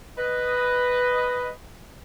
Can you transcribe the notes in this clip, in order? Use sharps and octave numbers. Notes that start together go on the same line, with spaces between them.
B4 D#5